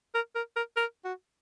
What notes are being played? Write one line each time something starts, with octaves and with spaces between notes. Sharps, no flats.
A#4
A#4
A#4
A#4
F#4